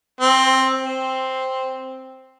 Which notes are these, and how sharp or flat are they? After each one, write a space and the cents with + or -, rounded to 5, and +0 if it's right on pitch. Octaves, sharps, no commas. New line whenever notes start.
C4 +10
C4 +0